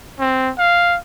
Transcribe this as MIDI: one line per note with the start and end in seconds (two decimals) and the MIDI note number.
0.19 0.51 60
0.58 0.97 77